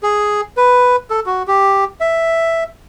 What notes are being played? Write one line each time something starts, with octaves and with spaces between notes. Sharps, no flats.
G#4
B4
A4
F#4
G4
E5